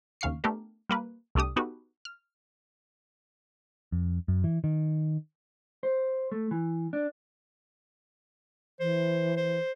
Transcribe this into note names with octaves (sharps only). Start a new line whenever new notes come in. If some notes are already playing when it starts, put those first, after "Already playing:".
D#2 C#3 F5 C#6 C7
A3 B3 D4 G4 A#4
G3 A#3 B4
C2 A3 D4 G4 D#6
B3 D#4 F#4 G4 A4 B4
F6
F2
F#2
E3
D#3
C5
A3
E3
D4
E3 C5
C5